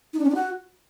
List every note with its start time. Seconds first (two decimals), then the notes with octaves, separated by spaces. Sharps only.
0.13 D#4
0.19 D4
0.24 C#4
0.29 D4
0.34 F#4